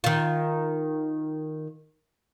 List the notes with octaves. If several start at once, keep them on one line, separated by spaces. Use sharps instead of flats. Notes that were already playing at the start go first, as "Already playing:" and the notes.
D#3 F4